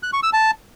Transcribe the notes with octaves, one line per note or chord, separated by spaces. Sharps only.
F#6
C#6
E6
A5